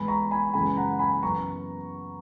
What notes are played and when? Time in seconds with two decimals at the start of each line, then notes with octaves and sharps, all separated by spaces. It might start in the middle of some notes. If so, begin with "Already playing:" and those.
Already playing: G#2 E3 G#3 B3 G#5 B5
0.08 A#5 C#6
0.31 G#5 B5
0.53 F#2 C#3 E3 G#3 C#4 G#5 B5
0.77 F#5 A#5
0.99 G#5 B5
1.22 F#2 E3 B3 A#5 C#6